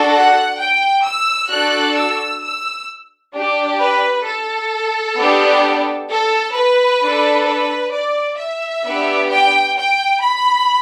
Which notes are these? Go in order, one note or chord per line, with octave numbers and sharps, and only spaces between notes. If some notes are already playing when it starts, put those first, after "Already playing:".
Already playing: D4 F#4 A4
F#5
G5
E6
D4 F#4 A4 F#6
E6
E6
D4 G4
B4
A4
B3 D4 G4
A4
B4
D4 A4
B4
D5
E5
B3 D4 G4
G5
G5
B5